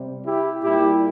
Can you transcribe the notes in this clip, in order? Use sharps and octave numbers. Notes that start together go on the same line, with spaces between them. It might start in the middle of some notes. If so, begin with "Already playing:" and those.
Already playing: C3 G3
E4 G4
A#2 G3 E4 G4